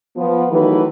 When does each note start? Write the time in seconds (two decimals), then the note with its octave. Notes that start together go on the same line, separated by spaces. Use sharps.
0.16 F3 B3
0.50 D#3 E3 F#3 A3 G4 B4